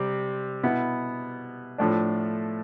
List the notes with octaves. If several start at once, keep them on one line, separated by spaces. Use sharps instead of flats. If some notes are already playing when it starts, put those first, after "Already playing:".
Already playing: C3 G3 C4
B2 B3 E4
A2 F3 A3 D4